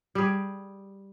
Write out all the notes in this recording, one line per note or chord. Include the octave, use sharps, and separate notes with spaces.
G3 G4 G#4